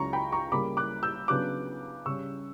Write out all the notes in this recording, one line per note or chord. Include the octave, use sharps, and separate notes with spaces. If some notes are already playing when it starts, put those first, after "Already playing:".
Already playing: C#2 C#3 F#3 C#4 A#5 C#6
G5 B5
A#5 C#6
C#3 G3 A#3 B5 D6
D6 F#6
E6 G6
C#3 F#3 B3 D4 D6 F#6
C#3 G3 C#4 C#6 E6